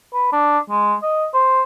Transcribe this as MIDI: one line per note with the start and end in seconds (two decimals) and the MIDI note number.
0.14 0.31 71
0.32 0.58 62
0.70 0.95 56
1.02 1.25 75
1.34 1.62 72